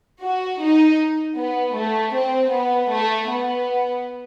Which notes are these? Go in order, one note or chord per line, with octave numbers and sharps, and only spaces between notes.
F#4
D#4
B3
A3
C4
B3
A3
B3